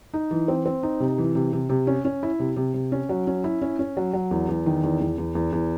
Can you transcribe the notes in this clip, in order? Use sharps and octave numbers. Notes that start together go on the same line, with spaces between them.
D#4
E3
C4
C4
D#4
C3
E3
C3
C3
C3
C#4
C#4
E4
C3
C3
C3
C#4
F#3
C#4
E4
C#4
C#4
F#3
F#3
E2
E2
D#3
E2
E2
E2
E2
E2